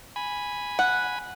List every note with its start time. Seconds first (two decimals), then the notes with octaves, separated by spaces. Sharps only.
0.16 G#5 B5
0.79 F#5